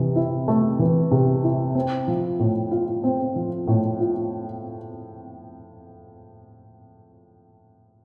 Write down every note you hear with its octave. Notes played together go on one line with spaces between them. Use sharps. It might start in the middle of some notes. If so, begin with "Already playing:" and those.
Already playing: C3 E3
E4
A3
E3
C3
E4
C4
F3
A2
F4
C4
F3
A2
F4